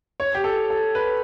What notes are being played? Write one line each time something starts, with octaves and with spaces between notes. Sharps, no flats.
C#5
G4
A4
A4
B4